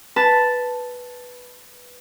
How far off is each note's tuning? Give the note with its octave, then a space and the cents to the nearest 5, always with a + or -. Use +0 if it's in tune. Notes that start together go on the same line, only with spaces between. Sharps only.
B4 +0 A5 +0